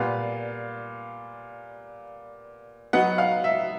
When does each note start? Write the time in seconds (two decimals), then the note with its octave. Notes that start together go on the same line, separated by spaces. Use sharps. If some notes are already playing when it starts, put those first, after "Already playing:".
Already playing: A#2 G3 B3 F5
2.93 F#3 B3 D#4 F#5
3.18 F5
3.44 E5